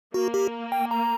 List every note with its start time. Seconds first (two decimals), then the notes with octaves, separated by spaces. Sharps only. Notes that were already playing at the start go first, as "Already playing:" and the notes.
0.14 A#3 F#4
0.34 G4
0.72 G5
0.91 A#5